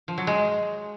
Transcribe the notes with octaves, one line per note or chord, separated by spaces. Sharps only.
F3
F#3
G#3